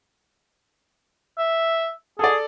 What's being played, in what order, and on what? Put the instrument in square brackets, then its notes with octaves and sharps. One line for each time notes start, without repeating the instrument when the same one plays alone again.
[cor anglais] E5
[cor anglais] G#4 [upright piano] A4 D5